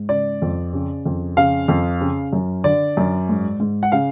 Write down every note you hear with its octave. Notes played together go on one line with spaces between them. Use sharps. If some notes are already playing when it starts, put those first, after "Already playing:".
Already playing: G#2
C#3 D5
F2
C#3
F2
C#3 F5
F2
C#3
F#2
D3 D5
F#2
G#2
G#2
F#5
C#3 F5